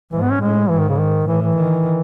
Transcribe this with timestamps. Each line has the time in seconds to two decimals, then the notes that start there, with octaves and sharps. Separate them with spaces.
0.12 G#2 E3
0.21 B3
0.31 C#4
0.41 A2 G#3
0.69 G#2 E3
0.79 D#3
0.89 C#3
0.98 D#3
1.27 A2 E3
1.41 E3
1.57 D#3